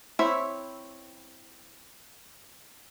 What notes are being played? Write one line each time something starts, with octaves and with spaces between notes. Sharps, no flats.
C4 E4 C#5 E5